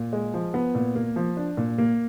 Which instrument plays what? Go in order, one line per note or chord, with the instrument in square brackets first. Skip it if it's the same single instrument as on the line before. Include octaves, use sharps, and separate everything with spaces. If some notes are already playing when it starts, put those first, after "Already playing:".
Already playing: [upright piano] A#2
G#3
F3
B3
A#2
A#3
F3
D4
A#2
A#3